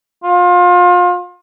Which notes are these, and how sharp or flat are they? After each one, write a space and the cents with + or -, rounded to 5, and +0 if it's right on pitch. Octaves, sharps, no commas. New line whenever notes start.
F4 +30